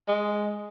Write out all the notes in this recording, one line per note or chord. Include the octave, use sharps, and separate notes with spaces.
G#3